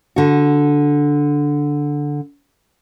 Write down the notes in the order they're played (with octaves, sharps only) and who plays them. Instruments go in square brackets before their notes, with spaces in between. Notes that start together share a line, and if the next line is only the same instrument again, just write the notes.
[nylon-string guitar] D3 F#4